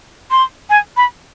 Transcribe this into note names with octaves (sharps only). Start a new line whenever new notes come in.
C6
G#5
B5